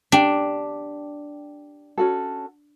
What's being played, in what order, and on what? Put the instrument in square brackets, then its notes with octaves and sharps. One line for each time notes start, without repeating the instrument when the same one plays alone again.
[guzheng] D4 [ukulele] G4 G5
[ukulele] C#4 F#4 A4